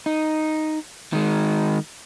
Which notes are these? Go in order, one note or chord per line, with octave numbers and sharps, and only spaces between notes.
D#4
D#3 G#3